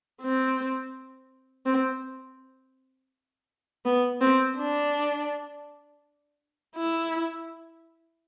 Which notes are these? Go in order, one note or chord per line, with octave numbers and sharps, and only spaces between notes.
C4
C4
B3
C4
D4
E4